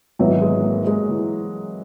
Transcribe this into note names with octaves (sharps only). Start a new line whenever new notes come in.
G#1 G#2 E3 F#3 B3
G#3
A#3
G#3
E3